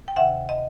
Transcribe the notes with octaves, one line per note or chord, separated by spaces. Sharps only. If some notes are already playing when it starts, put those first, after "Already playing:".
G5
D2 C3 D#3 E5 F#5
D#5